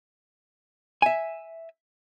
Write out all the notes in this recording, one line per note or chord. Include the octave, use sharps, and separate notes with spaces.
E5 G#5